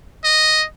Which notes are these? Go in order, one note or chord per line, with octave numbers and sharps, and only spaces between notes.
D#5